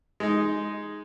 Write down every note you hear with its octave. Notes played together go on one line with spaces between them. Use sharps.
G#3 D#4